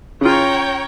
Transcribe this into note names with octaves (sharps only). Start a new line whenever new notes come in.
C#3 F4 C#5 G5 A#5